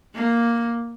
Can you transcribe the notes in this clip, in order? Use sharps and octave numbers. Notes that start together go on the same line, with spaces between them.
A#3